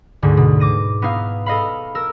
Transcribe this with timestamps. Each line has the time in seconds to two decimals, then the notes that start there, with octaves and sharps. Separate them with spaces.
0.22 D2 G#2 D3
0.37 B2
0.60 D6 A#6 D#7
1.02 B3 D#4 E4 F5
1.46 A4 D#5 F5 B5
1.95 A#4 E6